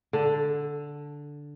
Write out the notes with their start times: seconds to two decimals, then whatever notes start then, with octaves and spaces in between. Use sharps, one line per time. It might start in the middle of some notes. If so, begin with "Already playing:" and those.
0.13 D3